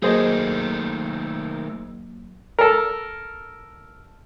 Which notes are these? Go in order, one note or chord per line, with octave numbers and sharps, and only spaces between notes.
D#3 F#3 A3 A#3 G#4 C5 D#5
A4 A#4